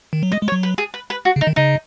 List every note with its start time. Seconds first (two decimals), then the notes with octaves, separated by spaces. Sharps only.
0.13 D#3
0.23 F#3
0.32 G#3 D#5
0.42 G#3
0.48 C#5
0.52 F#3
0.63 B4
0.78 G#4
0.94 B4
1.10 B4
1.25 F#4
1.36 C#3
1.41 D#4
1.47 D#3
1.56 C#3 D#4